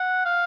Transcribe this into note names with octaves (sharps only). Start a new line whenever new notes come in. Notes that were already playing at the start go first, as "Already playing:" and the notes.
Already playing: F#5
F5